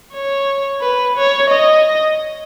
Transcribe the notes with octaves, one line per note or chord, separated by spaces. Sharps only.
C#5
B4
C#5
D#5